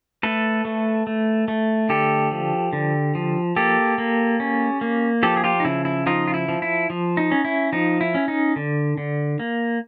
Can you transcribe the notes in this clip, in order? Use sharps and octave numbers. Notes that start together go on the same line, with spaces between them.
A3 A4 B4
A3
A3
A3
D3 G4 A4
F3
D3
F3
A#3 G4 A4
A#3
C#4
A#3
F3 G4 A4
G#4
F4 G4
D#4
C#3 E4
E4
F3 D#4 F4
F4
E4
F3
E4
F3
D#4
C#4
E4
F3 D#4
E4
C#4
D#4
D3
D3
A#3